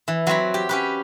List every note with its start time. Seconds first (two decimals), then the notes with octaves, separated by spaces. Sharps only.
0.08 E3
0.27 F#3 C4 F#4 B5
0.54 G4
0.69 C#4 G4 B4